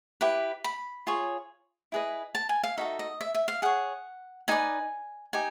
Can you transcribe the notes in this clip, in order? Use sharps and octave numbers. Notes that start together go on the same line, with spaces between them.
E4 G4 B4
B5
F4 G#4 C#5
E4 G#4 B4 D#5
A5
G#5
F5
D#4 F#4 A4 E5
D#5
E5
E5
F5
G#4 C#5 F#5
D#4 G#4 B4 D5 G#5
D#4 G4 G#5